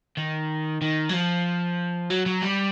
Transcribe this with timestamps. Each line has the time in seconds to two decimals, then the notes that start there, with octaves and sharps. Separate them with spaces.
0.17 D#3
0.82 D#3
1.09 F#3
1.13 F3
2.10 F#3
2.26 F#3
2.42 G3